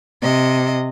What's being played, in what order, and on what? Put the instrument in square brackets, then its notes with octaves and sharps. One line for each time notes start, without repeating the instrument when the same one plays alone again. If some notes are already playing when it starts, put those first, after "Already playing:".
[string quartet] C3 D#5